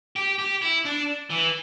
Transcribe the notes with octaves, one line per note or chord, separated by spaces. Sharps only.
G4
G4
E4
D4
E3